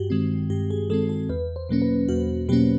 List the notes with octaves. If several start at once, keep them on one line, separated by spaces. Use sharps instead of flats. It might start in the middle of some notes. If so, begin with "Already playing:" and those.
Already playing: G2 F#4 G4
D#3 G#3 C4
G2 G4
G#4
D#3 G#3 C4 A4
A4
E2 B4
C5
B2 F#3 A#3 C#4
B4
E2 F#4
B2 F#3 A#3 C#4 G4